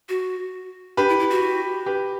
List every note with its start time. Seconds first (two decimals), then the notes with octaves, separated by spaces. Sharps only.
0.09 F#4
0.97 D4 G4 B4
1.09 E4
1.20 E4
1.30 F#4
1.86 G4 B4